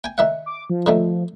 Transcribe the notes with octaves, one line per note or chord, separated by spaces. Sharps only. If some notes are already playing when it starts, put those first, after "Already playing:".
G5 G#5
D#3 E5 F#5
D6
F3
D3 D#3 A3